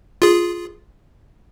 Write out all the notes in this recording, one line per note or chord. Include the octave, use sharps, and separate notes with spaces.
F4 G#4